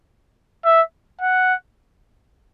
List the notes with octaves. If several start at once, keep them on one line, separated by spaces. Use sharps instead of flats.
E5
F#5